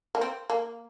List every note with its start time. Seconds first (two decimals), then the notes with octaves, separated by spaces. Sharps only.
0.15 A#3
0.21 C4
0.50 A#3